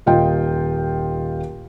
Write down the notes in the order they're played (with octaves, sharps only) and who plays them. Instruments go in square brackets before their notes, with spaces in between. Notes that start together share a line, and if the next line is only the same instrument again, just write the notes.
[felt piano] D#1 F4 D#5 G5